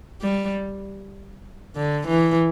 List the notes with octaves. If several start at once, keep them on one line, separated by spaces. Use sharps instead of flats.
G3
D3
E3